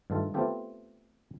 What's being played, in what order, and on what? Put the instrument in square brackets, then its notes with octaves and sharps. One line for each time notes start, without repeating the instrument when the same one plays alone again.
[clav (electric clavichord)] G2 D#3 A3 F4 A4
A3 B3 C4 F4 G4 A4